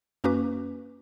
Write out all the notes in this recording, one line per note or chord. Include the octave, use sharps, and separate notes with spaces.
F#2 A#3 C#4 F#4 B4 D6